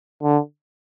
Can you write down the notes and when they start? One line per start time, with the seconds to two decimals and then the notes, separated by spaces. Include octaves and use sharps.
0.23 D3